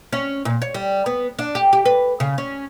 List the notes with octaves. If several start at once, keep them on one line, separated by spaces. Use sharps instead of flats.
C#4
A#2
C#5
G3
B3
D4
G4
G4
B4
C#3
C#4